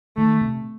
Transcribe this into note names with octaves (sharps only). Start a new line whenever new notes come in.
D#3 A3
C3